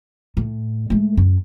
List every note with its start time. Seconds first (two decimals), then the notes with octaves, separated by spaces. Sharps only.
0.37 A2
0.90 G#3 A3
1.17 F#2